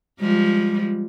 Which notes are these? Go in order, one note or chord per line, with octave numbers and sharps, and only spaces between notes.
F3 G3 G#3